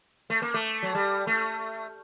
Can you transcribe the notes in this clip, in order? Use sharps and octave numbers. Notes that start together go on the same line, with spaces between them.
A3
A#3
A3
F#3
G3
A3